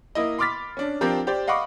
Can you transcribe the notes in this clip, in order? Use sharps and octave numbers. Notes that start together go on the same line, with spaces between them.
A#3 E4 D#5
B5 C6 D6 F6 A6 B6
C#4 D4
F3 C4 D4 G4 A#4
G4 C5 D5
D#5 F5 F#5 B5 C#6 D6